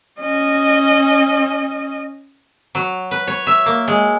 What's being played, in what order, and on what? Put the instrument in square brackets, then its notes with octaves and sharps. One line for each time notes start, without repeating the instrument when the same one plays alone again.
[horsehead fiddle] C#4 D#5
[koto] F#3
B4
C#5
E5
A#3
G#3